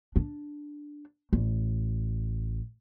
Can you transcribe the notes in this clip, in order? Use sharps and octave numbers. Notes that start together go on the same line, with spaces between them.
D4
A1